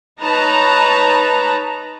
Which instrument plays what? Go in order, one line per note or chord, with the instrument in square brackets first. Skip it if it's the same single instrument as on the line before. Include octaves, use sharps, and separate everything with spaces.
[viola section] D#4 B4 C#5 A5 A#5